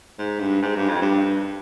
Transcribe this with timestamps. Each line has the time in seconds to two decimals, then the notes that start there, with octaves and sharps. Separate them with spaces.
0.19 G#2
0.40 G2
0.62 G#2
0.76 G2
0.88 F2
1.02 G2